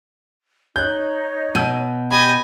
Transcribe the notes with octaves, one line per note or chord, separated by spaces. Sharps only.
D#4 C#5 F#6 G6
B2 E6 G6 D#7
G4 D#5 G#5 B5